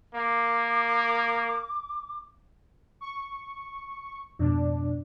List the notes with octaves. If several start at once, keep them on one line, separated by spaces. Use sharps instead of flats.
A#3 D6
C#6
F2 G#2 B2 D4